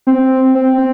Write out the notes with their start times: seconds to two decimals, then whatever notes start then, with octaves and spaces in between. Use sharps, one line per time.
0.07 C4
0.55 C4
0.78 C4